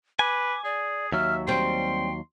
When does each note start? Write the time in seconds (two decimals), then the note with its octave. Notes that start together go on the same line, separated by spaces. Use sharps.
0.19 B4 G#5 D6
0.64 G#4 D5
1.12 D#2 F#3 E5 F6
1.47 G3 C4 G5 C6